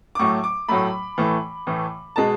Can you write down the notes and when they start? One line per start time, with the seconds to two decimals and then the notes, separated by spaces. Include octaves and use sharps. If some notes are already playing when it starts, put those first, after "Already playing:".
0.15 D6
0.19 A2 F#3 A3 C#6
0.44 D6
0.68 A2 F#3 A3 B5
1.17 A2 E3 A3
1.67 A2 E3 A3
2.16 B2 G#3 A5